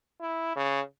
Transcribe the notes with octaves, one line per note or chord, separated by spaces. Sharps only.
E4
C#3